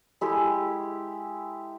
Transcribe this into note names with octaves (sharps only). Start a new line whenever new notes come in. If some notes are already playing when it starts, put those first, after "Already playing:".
G#3 E4 G4 A4